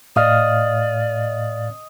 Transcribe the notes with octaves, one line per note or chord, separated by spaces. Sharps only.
A2 D5 D#5 F5 F6